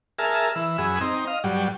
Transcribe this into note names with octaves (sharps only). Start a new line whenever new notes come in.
G#4 A#4 E5 A5 F6
E3 E6
F#2 G#4 B5 E6
C4 D#4
D#5 F5
G2 F#3 G3